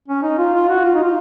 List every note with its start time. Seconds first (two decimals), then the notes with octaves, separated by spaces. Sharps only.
0.08 C#4
0.23 D#4
0.38 F4
0.54 F4
0.69 F#4
0.85 F4
0.95 D#4
1.04 F4